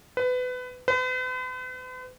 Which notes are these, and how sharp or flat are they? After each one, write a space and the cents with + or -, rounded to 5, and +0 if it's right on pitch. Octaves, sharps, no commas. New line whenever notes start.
B4 +25
B4 +45